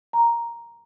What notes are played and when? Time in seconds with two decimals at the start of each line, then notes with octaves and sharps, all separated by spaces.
0.13 A#5